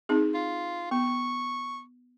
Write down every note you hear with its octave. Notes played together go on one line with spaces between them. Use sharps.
C4 D#4 G#4
F4
B3 C#6